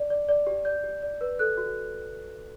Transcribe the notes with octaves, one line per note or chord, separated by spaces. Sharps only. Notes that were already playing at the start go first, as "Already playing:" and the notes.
Already playing: D5
D5
D5
G4
D5 G6
G4
D5
B4
A4 F#6
F#4